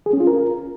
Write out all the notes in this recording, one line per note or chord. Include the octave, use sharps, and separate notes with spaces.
G#4
C#4
F4
A#4